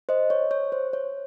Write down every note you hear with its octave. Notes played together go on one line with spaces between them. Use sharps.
C5 D#5
C#5
C#5
C5
C#5